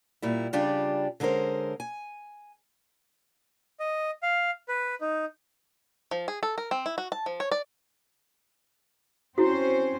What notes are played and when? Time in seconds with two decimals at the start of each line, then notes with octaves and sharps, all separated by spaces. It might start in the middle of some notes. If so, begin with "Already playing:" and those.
0.22 A#2 G3 E4
0.53 C#3 G3 D4 F4 G4
1.20 D3 G#3 C#4 A#4 C5
1.80 G#5
3.80 D#5
4.23 F5
4.68 B4
5.01 D#4
6.11 F3
6.28 G#4
6.43 A4
6.58 A#4
6.71 C4
6.86 E4
6.98 F#4
7.12 A5
7.26 F3
7.40 C#5
7.52 D5
9.38 C4 C#4 E4 F#4 C5